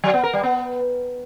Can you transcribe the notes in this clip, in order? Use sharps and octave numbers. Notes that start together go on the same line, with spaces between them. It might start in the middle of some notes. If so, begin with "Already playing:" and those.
F#3
B3
A#4
G3
B3